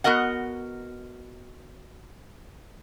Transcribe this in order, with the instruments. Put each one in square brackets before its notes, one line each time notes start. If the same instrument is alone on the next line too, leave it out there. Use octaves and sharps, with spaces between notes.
[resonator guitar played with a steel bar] B3 F#4 A#4 D#5 F#5